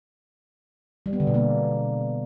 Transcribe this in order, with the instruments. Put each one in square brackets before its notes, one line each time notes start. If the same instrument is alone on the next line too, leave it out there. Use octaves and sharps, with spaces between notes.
[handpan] G3
B3
D3
B2
A#3